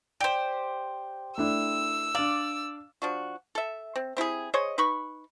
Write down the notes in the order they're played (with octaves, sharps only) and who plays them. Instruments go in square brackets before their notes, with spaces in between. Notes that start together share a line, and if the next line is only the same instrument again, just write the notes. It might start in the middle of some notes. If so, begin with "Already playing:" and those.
[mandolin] G4 C5 [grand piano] D5
[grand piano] A3 D4 E4 [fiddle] E6
[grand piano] D4 F5 [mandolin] D5
[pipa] F3 D4 F#4
A4 E5
C4
C4 E4 G4 G#4
G#4 C5 C#5 D#5
D#4 B4 B5 C#6